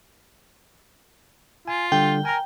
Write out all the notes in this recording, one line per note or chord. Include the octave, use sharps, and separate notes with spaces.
F4 G#5
D3 G3 G5
A#4 G#5 A#5